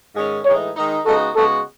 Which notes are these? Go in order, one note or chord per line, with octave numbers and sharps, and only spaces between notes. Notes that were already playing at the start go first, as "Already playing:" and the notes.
G#2 D#3 G#3 C#4
A2 E3 G#3 D#4 C#5
D#3 G#3 D#4
C#3 G#3 B3 D#4 F#4 A4
C#3 G#3 B3 F#4 A4